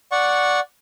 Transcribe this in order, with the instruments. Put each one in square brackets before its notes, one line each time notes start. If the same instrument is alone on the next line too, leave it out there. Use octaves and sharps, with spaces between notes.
[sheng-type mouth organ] D5 F#5 C#6